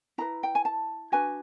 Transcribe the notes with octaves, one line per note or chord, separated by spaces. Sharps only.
E4 G#4 B4 A#5
G5
G#5
A5
D4 F#4 B4 G#5